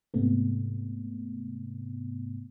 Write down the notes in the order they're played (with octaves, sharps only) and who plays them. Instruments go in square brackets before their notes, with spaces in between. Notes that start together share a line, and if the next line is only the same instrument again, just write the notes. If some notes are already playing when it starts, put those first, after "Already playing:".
[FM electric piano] G#2 C3 A3 B3